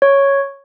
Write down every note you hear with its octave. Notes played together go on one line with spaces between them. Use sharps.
C#5